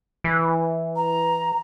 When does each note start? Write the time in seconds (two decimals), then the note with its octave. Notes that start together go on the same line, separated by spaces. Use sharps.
0.24 E3
0.96 A#5